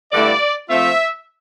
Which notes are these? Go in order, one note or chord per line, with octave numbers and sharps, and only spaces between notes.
G2 D3 A3 E4 D5
F3 A3 C4 F4 E5